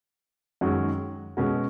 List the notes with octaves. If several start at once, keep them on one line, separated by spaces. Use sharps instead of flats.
F#2 D#3 G#3 C#4 F#4
B2 G#3 C#4 F#4